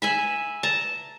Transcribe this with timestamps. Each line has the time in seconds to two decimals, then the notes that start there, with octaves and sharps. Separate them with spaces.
0.02 E5 G#5 B5
0.63 A5 A#5